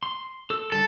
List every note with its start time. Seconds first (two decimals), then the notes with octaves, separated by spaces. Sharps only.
0.03 C6
0.50 A4 E6
0.72 D3 G3 A4